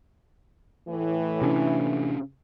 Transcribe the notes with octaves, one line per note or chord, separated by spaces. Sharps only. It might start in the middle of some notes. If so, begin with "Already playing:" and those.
A2 E3
C3 C#4 D4